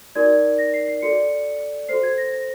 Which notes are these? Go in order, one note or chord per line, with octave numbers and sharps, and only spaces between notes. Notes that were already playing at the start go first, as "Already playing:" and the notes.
D#4 F#4 A#4 D5 G#6
A#6
C7
C7
F#4 A4 D5 C#7
F#4 A4 C5 C7
G#6
A#6
A#6